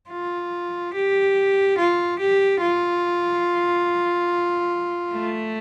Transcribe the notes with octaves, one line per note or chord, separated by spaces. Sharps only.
F4
G4
F4
G4
F4
A3